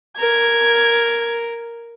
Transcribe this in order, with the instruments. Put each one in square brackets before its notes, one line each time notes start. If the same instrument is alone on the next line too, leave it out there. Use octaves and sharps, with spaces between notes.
[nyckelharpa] A#4 [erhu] G#6